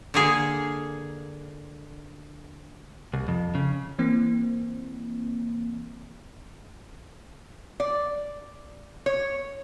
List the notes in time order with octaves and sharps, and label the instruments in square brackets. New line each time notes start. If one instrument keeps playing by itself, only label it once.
[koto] D3 A#3 G#4
[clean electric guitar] C2
F2
C#3
[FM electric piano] E3 A#3 C4
[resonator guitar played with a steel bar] D5
C#5